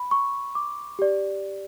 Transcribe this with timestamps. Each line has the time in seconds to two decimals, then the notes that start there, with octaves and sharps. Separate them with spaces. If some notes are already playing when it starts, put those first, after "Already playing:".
Already playing: B5
0.11 C#6
0.55 D6
0.99 G4 D5